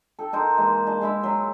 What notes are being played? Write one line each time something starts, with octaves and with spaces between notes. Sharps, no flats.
A4 G5
D#4 A#4 C5
E3 G#3 A#3
D#5 A5
G#3 E4 E5
F#3 E5